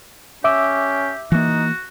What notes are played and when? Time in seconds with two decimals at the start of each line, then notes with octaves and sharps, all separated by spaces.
0.44 C#4 G4 E5 D6 E6
1.32 E3 A#3 D#4 F#4